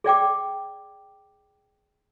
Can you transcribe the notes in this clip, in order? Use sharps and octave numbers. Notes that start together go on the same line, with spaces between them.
G#4 D5 G5 D6